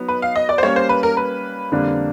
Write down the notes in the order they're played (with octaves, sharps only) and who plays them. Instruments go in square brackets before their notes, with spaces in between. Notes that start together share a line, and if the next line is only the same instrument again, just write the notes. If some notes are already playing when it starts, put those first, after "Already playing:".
Already playing: [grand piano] F#3 B3 D#4
[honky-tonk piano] B4
F5
D#5
D5
C5
[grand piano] G3 A#3 C#4 [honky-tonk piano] C#5
[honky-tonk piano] C5
B4
A#4
B4
[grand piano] F2 D3 G3 A#3 D4